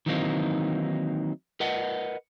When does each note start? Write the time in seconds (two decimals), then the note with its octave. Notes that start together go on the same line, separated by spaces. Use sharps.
0.06 D#3 E3 F#3 A#3 C4 D#4
1.60 A#4 B4 D#5 F#5